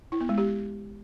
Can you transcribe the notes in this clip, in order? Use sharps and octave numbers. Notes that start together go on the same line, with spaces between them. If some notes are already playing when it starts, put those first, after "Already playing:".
E4
B3
G#3
G4